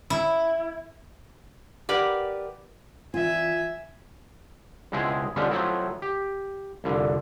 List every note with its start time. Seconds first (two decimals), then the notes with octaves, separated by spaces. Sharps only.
0.10 E4
1.89 G4 A#4 B4 D5 F#5
3.14 E3 C4 F4 E5 G#5
4.92 C#2 B2 G#3 C4 E4 G#4
5.36 B2 D3 F3 G3 G#3 C#4
5.51 F3 F#3 A3 C4 E4
6.02 G4
6.84 C2 F2 D3